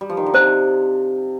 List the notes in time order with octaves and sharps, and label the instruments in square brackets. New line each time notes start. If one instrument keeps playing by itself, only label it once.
[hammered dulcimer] G3
F3
D#3
D3
[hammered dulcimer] C3 [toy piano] C5